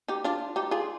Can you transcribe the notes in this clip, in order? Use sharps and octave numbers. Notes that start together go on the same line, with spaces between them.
D#4 G4
D4 F4
D#4 G4
F4 G#4